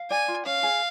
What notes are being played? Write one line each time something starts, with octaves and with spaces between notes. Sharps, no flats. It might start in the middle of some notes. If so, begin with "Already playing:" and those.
Already playing: F5
D5 G#5
F4
C#4 F5
G#4